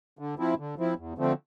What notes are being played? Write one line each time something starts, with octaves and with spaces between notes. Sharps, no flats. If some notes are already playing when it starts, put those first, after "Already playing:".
D3
F3 C4 E4
D3
F3 C4 E4
E2
D3 F3 A3 C4